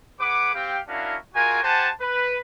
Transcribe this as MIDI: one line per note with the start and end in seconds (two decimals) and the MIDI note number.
0.20 0.54 68
0.20 0.54 71
0.20 0.54 78
0.20 0.54 86
0.54 0.79 60
0.54 0.79 67
0.54 0.79 77
0.54 0.79 79
0.88 1.16 61
0.88 1.16 62
0.88 1.16 64
0.88 1.16 66
0.88 1.16 70
0.88 1.16 77
1.34 1.59 56
1.34 1.59 65
1.34 1.59 66
1.34 1.59 70
1.34 1.59 80
1.63 1.90 67
1.63 1.90 72
1.63 1.90 78
1.63 1.90 80
1.63 1.90 81
2.00 2.38 71